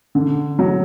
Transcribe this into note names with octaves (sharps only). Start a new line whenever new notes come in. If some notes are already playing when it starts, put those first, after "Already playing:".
D3
F#3